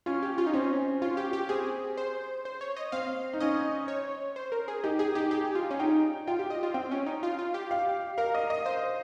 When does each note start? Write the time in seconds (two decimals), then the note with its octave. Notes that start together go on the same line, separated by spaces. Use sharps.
0.06 C#4 F4
0.23 G4
0.38 F4
0.47 D#4
0.54 C4 C#4
1.02 C#4 F4
1.17 G4
1.33 G4
1.49 C4 G#4
1.97 C5
2.45 C5
2.61 C#5
2.76 D#5
2.92 C4 F5
3.33 D#4
3.40 C#4 D#5
3.88 C#5
4.36 C5
4.52 A#4
4.68 G#4
4.84 D#4 G4
4.99 G4 G#4
5.15 D#4 G4
5.31 G4 G#4
5.55 F4
5.71 C#4
5.79 D#4 G5
6.27 F4 G5
6.39 G4
6.50 D#5
6.63 F4
6.74 C4 G5
6.91 C#4
7.06 D#4
7.23 F4
7.39 F4
7.54 G4
7.71 F5
8.18 A#4 F5
8.34 D#5
8.50 D#5
8.66 C5